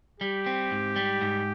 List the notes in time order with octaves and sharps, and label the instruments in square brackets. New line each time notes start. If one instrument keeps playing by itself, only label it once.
[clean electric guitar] G3 [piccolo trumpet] G4
[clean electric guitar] C4
G#2
G3
G#2